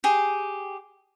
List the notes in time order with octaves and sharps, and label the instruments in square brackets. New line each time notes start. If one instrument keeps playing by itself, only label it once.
[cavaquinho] G4 G#4